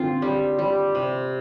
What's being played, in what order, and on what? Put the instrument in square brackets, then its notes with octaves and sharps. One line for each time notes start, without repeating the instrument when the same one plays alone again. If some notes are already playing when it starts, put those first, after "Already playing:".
Already playing: [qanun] D3 F4 [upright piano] C4
[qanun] G3
G3
C3